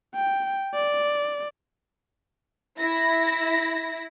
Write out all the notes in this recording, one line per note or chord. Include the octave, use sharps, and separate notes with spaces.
G5
D5
E4 A#6